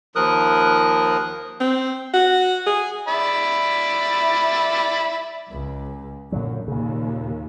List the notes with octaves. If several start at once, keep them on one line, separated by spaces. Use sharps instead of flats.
D#2 F3 A#4 D#6 F#6
C4
F#4
G#4
D5 E5 B5
C#2
F#2 A#2 D3 F#3
D#2 A#2 C#3